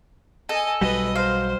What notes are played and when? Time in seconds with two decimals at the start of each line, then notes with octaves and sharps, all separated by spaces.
0.49 A4 D#5 G#5
0.81 B1 F#3 G3 B4 D#5
1.16 C5 F5